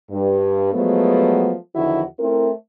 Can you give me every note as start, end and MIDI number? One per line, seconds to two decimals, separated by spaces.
0.11 0.71 43
0.74 1.54 53
0.74 1.54 54
0.74 1.54 56
0.74 1.54 57
0.74 1.54 59
1.76 2.02 40
1.76 2.02 50
1.76 2.02 51
1.76 2.02 53
1.76 2.02 64
1.76 2.02 66
2.19 2.50 57
2.19 2.50 60
2.19 2.50 64
2.19 2.50 70